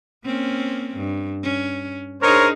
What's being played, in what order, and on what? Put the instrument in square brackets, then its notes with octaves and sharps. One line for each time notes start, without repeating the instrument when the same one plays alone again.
[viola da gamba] A#3 C4 C#4
G2
C#4
[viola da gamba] D4 D#4 G#4 [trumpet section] A#4 C5 C#5